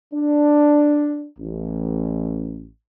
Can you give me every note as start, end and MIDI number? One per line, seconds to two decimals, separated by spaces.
0.14 1.27 62
1.39 2.67 33